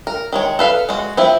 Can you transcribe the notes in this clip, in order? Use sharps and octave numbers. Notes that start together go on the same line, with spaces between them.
A#4
D#3 G#3 C#5
A4 B4 F5
G#3 F#4
F3 C4 E4